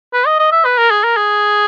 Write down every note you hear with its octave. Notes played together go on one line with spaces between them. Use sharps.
B4
D#5
D#5
E5
B4
A#4
G#4
A#4
G#4